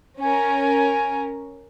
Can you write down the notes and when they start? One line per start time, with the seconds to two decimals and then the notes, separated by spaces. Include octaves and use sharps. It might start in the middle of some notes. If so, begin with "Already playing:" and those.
0.20 C#4 A#4 G#5